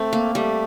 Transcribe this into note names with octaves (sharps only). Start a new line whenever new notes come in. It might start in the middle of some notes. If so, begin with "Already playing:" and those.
Already playing: A3 C4
A#3
G3 A3